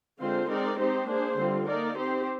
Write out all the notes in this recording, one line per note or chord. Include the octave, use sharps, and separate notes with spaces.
D3 G#3 C4 F4 C5
G#3 C4 D#4 A#4 D5
C4 D#4 G4 C5
A#3 D4 G#4 C5
D3 G3 C4 F4
A#3 D#4 A#4 D5
C4 G4 C5